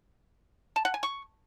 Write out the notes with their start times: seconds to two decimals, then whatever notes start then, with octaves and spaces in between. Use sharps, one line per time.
0.76 A5
0.85 F#5
0.94 G#5
1.03 C#6